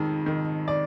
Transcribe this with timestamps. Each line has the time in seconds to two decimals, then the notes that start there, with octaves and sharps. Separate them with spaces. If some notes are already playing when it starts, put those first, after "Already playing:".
Already playing: F2 D#3 G#3
0.26 D#3
0.68 D5